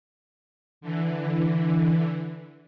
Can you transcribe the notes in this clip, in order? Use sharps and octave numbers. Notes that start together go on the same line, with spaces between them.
D3 E3